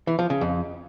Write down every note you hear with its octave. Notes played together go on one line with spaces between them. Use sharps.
E3
F3
C#3
F2